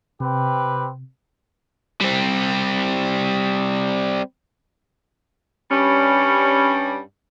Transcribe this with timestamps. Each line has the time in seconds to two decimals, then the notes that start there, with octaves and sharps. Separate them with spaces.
0.20 C3 C4 G4 B4
2.01 G3 C4
5.71 G2 G3 C#4